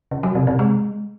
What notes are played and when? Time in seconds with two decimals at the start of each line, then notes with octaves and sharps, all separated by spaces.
0.11 C#3
0.23 F#3
0.35 C3
0.47 C3
0.59 G#3